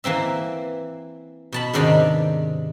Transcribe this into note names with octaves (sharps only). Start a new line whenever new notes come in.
E3 A#3 C4 E5
B2 A5 B5
G#2 C3 D#3 D4 A#5 B5